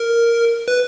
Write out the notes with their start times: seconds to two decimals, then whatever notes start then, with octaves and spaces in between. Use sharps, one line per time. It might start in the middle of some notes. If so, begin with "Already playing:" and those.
Already playing: A#4
0.68 B4